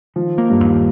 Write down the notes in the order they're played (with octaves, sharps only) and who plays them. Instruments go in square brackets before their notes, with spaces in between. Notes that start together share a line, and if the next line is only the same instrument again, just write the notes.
[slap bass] D#3 [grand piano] F3
[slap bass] A#3
[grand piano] G2
[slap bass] D#2